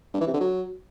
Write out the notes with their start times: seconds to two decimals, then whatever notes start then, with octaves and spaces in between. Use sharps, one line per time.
0.14 G2
0.21 E3
0.27 C3
0.34 D3
0.40 F#3